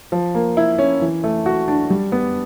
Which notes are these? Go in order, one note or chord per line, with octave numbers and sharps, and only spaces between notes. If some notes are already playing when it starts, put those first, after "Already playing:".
F3
A#3
E4
C#4
E3
A3
F#4
D4
G3
B3